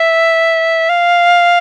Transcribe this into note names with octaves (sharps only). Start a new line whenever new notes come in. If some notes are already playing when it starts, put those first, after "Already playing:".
Already playing: E5
F5